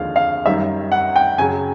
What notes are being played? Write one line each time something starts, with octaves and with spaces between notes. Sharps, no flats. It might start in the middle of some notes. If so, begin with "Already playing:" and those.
Already playing: D#2 D3 F3 G#3 F5
F5
F#2 D#3 G3 E5
F#5
G5
F#2 C#3 F#3 G#5